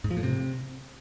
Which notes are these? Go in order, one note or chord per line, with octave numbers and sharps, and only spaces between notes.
G#2
F3
A2
C3